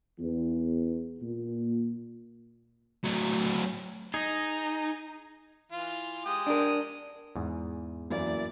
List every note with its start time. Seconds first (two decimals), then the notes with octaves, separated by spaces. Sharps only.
0.19 E2
1.21 A#2
3.04 F#3 A3
4.14 D#4 G#4 D#5
5.72 E3 F4
6.26 G#3 G4 D#6
6.47 D4 A#4
7.36 E2 G#2
8.11 F#2 E3 A#3 D5